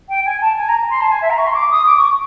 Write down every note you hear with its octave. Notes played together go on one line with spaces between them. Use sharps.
G5
G#5
A5
G#5
A#5
C6
A5
G#5
E5
A#5
C#6
C6
D6
D#6
D6
C#6